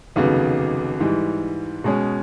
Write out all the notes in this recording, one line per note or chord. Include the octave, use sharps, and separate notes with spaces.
F1 D#2 C#3 F#3 B3
G#2 E3 G3
B2 G#3 C#4